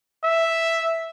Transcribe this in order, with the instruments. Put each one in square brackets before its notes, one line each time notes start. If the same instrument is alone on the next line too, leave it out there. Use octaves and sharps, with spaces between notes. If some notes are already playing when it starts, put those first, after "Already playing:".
[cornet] E5